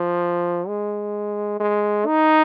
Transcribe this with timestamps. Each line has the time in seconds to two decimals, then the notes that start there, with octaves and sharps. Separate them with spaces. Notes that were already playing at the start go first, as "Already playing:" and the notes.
Already playing: F3
0.68 G#3
1.60 G#3
2.06 D#4